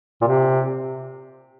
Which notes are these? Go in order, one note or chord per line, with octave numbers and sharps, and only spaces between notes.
A#2
C3